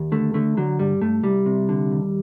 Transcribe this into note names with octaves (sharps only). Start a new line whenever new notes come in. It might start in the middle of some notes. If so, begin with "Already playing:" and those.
Already playing: D#2
D3 A3
D3 A3
D3 F#3
G2 G3
G2 A3
C2 G3
C3
D3
D#2